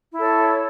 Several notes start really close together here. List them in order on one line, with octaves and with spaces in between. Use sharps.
E4 A4 C#5